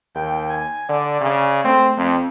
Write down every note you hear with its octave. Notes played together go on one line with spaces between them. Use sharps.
D#2 G5
G#5
D3 D5
C#3
A3 C4
F2 C4